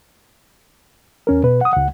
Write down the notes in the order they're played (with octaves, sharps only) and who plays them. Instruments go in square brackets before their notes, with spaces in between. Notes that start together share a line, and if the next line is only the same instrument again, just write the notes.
[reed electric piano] E2 C#4 A#4
B2 B4
F#5 D#6
C#2 F#5